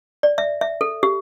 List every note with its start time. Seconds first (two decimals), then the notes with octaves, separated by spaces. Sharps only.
0.23 D5
0.38 E5
0.61 E5
0.81 A4
1.03 G4